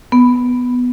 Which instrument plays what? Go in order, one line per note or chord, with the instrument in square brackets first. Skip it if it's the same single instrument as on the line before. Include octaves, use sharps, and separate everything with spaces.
[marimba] B3